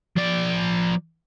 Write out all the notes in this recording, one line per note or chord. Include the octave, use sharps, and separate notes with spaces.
F3 D5